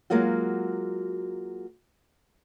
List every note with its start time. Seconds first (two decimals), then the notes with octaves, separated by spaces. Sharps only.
0.10 F#3 G#3 A#3 F4 F#4